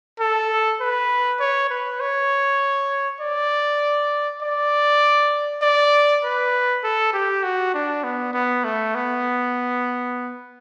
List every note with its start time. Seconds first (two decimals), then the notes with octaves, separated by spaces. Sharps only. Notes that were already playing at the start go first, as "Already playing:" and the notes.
0.20 A4
0.80 B4
1.40 C#5
1.70 B4
2.00 C#5
3.21 D5
4.42 D5
5.62 D5
6.24 B4
6.84 A4
7.13 G4
7.43 F#4
7.74 D4
8.04 B3
8.34 B3
8.64 A3
8.95 B3